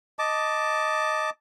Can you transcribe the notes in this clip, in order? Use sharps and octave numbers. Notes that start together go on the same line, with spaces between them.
D#5 A5 D6